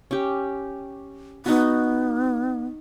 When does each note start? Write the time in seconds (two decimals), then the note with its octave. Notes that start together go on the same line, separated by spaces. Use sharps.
0.11 C#4 G4
1.46 B3 D#4 F#4